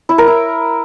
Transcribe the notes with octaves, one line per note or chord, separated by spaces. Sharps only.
E4
A#4
E4